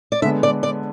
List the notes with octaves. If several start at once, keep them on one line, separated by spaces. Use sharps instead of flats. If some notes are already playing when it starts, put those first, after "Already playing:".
D5
D3 G#3 B3 E5
D5
D5